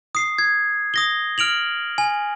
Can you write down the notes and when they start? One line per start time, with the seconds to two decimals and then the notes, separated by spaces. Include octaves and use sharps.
0.15 D#6 C7
0.38 G#6
0.94 D#6 A#6 G7
1.38 F6 D7 F7 F#7
1.98 G#5